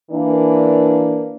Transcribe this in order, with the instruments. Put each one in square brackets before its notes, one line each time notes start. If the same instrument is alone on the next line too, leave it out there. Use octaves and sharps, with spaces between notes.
[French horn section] E3 A#3 D4